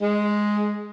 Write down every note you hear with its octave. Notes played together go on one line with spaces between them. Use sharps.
G#3